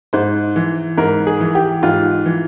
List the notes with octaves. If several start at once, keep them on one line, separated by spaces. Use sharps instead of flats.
G#2 C5
E3
G#2 A#4
G#4
E3
G4
G#2 F4
E3